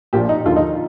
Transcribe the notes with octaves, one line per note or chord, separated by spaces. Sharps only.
A#1 A#2 F3 G4
D#4
D#2 D3 F3 F4
D#4